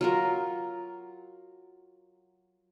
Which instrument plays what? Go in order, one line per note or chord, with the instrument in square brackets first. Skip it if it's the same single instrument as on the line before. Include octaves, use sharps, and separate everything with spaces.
[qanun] F#3 F4 A#4